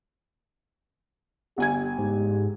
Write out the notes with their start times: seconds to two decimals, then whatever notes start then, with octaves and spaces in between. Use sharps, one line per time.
1.58 G1 G4 G#5 G#6
1.98 G#2